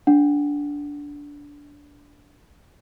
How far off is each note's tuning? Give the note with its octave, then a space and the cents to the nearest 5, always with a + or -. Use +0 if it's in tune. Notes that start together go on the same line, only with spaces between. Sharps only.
D4 -15 F#5 +0